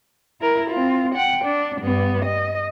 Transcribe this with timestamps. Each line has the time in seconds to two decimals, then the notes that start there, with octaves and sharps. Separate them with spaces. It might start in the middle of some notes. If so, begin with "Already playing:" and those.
0.41 E4 A#4
0.70 C4 F4
1.15 F#5 G5
1.44 D4
1.81 G2 B3
2.25 D#5